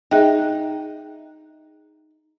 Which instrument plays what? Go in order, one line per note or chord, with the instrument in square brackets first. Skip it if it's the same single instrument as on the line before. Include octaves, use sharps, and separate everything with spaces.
[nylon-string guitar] D#4 [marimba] G#4 E5 G5